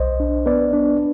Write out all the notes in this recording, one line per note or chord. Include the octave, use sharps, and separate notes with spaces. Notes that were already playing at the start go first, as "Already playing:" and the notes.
Already playing: B1 C5 D#5
D4
B3 B4 D5
D4